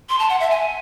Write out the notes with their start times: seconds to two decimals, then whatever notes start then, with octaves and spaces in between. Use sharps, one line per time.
0.09 C6
0.19 A5
0.29 F#5
0.40 E5
0.51 G#5